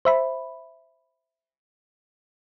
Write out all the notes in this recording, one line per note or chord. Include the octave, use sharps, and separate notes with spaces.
C5 E5 B5